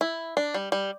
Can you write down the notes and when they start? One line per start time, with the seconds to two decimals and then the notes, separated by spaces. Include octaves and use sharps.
0.01 E4
0.37 D4
0.54 G3
0.72 G3